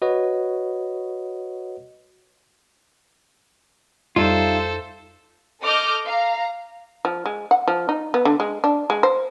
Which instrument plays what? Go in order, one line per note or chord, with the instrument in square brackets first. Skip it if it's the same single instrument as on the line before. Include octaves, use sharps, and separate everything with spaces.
[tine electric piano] F#4 B4 C#5 D#5 F#5
[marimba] F2 [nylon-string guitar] G3 D#4 E5 [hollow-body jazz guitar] F4 [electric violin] A4 C5
[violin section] A4 D#5 D6 F6 G6
F5 A#5
[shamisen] F3
G#3
F#5
F3
D#4
B3
D3
G#3
D4
G#3
C5